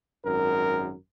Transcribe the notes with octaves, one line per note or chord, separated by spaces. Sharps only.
G#1 F#2 A#4